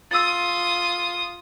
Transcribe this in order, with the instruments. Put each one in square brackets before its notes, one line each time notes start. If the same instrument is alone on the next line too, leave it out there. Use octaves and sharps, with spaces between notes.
[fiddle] F4 D#6 [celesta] E6 A6